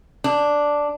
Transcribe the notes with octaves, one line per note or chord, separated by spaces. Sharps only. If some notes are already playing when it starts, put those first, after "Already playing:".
D4